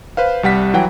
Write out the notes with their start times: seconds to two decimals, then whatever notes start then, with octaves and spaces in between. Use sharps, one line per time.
0.17 B4 C5 F5
0.43 C2 G3 F#5 B6
0.74 E3 F#3 F#5 G5